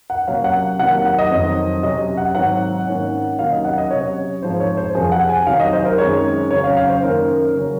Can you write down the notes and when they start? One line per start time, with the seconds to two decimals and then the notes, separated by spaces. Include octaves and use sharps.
0.10 F#5
0.27 C3 F#3 A#3 C#4 F5
0.44 F#5
0.79 C3 D#3 F#3 A#3 F#5
1.05 F#5
1.19 D#5
1.31 F2 D#3 F#3
1.83 C3 F#3 C#4 D#5
2.17 F#5
2.35 G#2 D#3 F#3 C4 F#5
2.87 G#2 D#3 A#3 C#4
3.39 C3 D#3 F#3 A#3 C#4 F5
3.52 D#5
3.64 F#5
3.78 D#5
3.91 C3 F#3 C#4 C#5
4.43 G#2 F3 G#3 C4 C5
4.60 C#5
4.77 C5
4.95 F2 C3 F3 C4 G#4
5.12 F#5
5.29 G#5
5.47 C3 D#3 F#3 F5
5.60 D#5
5.73 C5
5.85 A#4
5.98 F#2 D#3 G#3 C4 C#5
6.50 C#3 F#3 C#4 C#5
6.64 F5
6.77 F5
6.89 C5
7.03 F#2 D#3 A#3 C#4 A#4
7.54 C#3 F#3 C#4